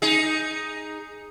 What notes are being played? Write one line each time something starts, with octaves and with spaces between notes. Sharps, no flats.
D#4 G#4